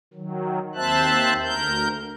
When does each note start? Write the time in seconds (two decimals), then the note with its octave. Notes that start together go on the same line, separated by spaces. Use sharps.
0.14 D#3 F#3
0.75 D#2 C4 C5 E5 A5 F#6
1.42 D2 A#4 G6